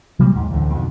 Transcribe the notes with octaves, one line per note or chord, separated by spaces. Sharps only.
C3 F#3 G3 A#3
D#2 G#2
A1 D2 A2 D3
F2 B2 D3 D#3